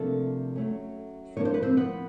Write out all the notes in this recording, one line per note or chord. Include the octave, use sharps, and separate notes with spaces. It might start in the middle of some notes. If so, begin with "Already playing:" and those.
Already playing: C3 F3 A3 A#3 D4 A4
F#3 A3 C#4
F3 A#3 D4 C#5
C5
B4
C4 C5
B3 B4